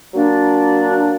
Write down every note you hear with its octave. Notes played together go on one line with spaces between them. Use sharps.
A#2 F#3 A#3 D4